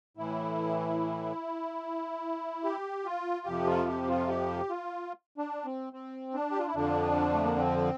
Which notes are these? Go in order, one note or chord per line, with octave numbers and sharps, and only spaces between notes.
A2 E3 E4
G4
F4
F2 C3 F3 G4
F4
G4
F4
G4
F4
D4
C4
C4
D4
G4
F4
E4
F2 D3 F3 D4
A3
A#3
C4